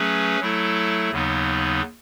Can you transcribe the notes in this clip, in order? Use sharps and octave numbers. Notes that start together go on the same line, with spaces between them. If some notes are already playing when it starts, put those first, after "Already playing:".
Already playing: F#3 A3 C#4 G#4 B4
F#3 A3 E4 A4
D#2 C#3 F#3 B3 D#4